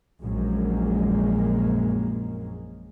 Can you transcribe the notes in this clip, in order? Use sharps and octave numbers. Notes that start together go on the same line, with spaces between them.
A#1 F#2 G#3 A#3